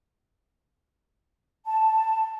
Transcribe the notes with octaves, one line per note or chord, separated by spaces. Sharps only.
A5